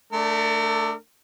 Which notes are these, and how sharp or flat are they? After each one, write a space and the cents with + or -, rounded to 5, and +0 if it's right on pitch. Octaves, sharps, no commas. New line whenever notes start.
A3 +0 D4 +0 A#4 -40